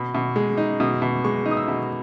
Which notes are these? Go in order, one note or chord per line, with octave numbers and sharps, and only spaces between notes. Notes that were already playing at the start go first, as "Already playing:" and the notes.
Already playing: B2 B5
B2
G#3
D#4
B2
B2
G#3 C#6
D#4
D#6
E6
B2